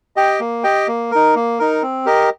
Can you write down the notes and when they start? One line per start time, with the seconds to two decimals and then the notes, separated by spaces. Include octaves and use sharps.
0.16 G4 D#5 G5
0.40 A#3
0.64 G4 D#5 G5
0.88 A#3
1.11 D#4 A#4
1.35 A#3
1.59 D#4 A#4
1.82 C4
2.06 G4 A#4 D#5